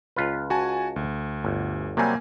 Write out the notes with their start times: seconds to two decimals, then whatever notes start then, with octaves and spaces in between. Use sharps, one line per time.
0.16 C#2 F4 B4
0.50 F#4 G#5 A5
0.96 D2
1.45 G1
1.97 C3 F#3 G3 A#3 G#5